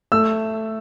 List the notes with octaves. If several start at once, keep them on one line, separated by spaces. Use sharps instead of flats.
A3 E6